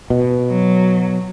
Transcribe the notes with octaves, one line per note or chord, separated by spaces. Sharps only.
B2
F#3